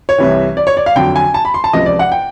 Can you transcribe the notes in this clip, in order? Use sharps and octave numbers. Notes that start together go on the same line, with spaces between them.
C#5
C2 C3 E3
D5
C#5
D5
F5
F2 D3 F#3 G5
G#5
A5
B5
C6
A5
C#2 C3 F3 D#5
D5
F#5
G5